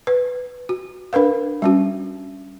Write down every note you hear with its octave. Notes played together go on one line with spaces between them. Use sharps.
B4
F#4
D4 A#4 B4 F5
G3 C#4 F#4